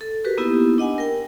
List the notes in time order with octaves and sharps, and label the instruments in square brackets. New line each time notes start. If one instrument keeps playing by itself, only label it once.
[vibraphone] A4
F#4 G4 A#4 B4
A#3 B3 D#4 E4 G4
D4 D#5 F#5 G#5
A#4 G5